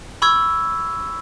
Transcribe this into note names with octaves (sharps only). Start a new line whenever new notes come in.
B5 C#6 E6 G#6